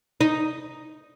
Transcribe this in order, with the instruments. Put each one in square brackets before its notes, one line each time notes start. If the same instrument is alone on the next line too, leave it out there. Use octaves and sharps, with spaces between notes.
[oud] D#4